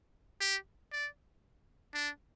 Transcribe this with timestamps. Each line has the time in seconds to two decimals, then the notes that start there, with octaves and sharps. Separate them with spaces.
0.40 G4
0.92 D5
1.94 D4